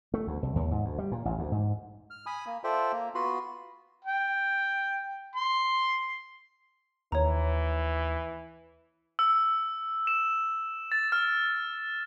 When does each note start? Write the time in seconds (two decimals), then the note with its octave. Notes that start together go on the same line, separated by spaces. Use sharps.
0.14 A3
0.27 D2
0.43 C2
0.56 D#2
0.71 G#2
0.85 D2
0.98 G3
1.12 A#2
1.25 A1
1.39 D2
1.52 G#2
2.10 F6
2.26 G#5 B5 D#6
2.46 A#3
2.64 F4 A4 C5 D5 E5 G5
2.92 A#3
3.15 B3 F4 F#4 B4 B5 C6
4.04 G5
5.35 C6
7.12 D#2 E3 C#5 A#5
9.19 E6
10.07 E7
10.92 A6
11.12 F6